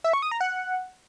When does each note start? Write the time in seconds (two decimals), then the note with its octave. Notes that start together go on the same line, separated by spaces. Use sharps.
0.04 E5
0.13 C#6
0.22 D#6
0.31 A#5
0.41 F#5